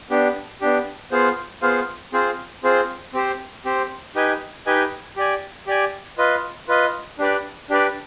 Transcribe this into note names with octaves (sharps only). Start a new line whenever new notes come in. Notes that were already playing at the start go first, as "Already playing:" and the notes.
B3 D4 G4
B3 D4 G4
B3 F4 G#4 C5 F5
B3 F4 G#4 C5 F5
C4 F4 G#4 C5
C4 F4 G#4 C5
C4 G4 C5
C4 G4 C5
D#4 G4 B4 D#5 G#5
D#4 G4 B4 D#5 G#5
G4 D5 G#5
G4 D5 G#5
F4 B4 D#5
F4 B4 D#5
D4 G4 B4 D5
D4 G4 B4 D5